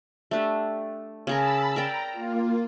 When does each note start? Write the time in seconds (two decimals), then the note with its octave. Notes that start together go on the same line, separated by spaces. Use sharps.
0.31 A3 D4 G4
1.27 C#3 G#4 A#4 A5 B5 E6
1.76 A#4 D5 G5 A#5
2.12 A#3 F4